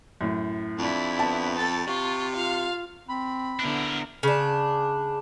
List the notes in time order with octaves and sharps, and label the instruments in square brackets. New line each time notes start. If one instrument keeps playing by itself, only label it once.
[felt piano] F#2 A2
[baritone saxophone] F2 [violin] D4 E4
[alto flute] B3 [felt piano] A5
[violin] A4 A6
[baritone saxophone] C3 [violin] F4 [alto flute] C#6
[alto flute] F4 [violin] F5
[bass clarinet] C4 [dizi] B5
[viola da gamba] D3 B3 E4 [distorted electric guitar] D4 A#4
[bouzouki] C#3 D4